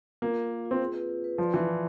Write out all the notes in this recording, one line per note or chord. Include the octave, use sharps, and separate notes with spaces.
A#3 F4
F4
A#4
F4
C4
G#4
B4
F4
B4
F3 D5
E3 D5
E4